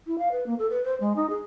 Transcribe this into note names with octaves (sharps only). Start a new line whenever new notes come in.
E4
F5
B4
A#3
A4
B4
C5
G#3
D#4
G#4